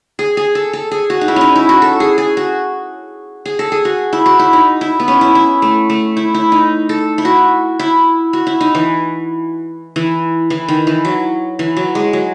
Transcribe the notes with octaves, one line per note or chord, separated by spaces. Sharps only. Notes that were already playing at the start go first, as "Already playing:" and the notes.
G#4
G#4
A4
A4
G#4
F#4
D#4
E4
C#4 D#4
E4
F#4
A4
G#4
G#4
F#4
G#4
A4
G#4
F#4
E4
F#4
E4
D#4
E4
B3
C#4
E4
E4
A3
A3
E4
E4
D#4
A4
E4
F#4
E4
F#4
E4
D#4
E3
E3
E3
D#3
E3
F#3
E3
F#3
G#3
F#3